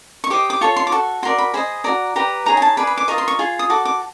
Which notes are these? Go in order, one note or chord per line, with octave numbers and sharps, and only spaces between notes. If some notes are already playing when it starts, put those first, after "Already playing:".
C#6
G4 C5 D#5 D6
D6
F4 A4 C#5 C#6
C6
D6
F#4 A4 C#6
F#4 A#4 D5 C6
B5
G#4 C5 D#5 B5
F#4 A4 D5 A#5
G4 B4 D5 A#5
D#4 G#4 C#5 A#5
G#5
A5
G#4 B4 D5 B5
B5
D6
F4 A#4 D#5 C#6
C6
C#6
F4 G#4
D#6
F#4 A4 D6
D6